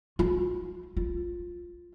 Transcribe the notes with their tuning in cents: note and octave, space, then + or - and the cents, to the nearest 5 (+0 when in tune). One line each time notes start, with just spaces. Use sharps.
F4 +45
F4 +5